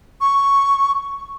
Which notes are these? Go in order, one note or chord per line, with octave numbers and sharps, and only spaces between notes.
C#6